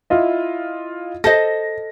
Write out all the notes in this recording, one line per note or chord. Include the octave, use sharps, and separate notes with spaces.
E4 F4 D#5
A4 C5 D#5 A#6